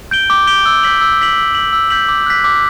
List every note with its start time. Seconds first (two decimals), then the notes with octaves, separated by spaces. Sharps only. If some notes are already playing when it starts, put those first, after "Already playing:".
0.11 G6 D7 G7
0.30 D6
0.47 G6 D7 G7
0.66 E6
0.83 G6 B6 F#7
1.01 E6
1.19 G6 B6 F#7
1.37 E6
1.55 G6 B6 F#7
1.73 E6
1.90 G6 B6 F#7
2.09 D6
2.26 F#6 B6
2.44 D6